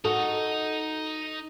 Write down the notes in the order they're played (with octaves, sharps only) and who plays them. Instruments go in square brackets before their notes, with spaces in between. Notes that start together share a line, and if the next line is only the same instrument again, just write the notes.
[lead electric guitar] D#4 D#5 [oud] F#4 A4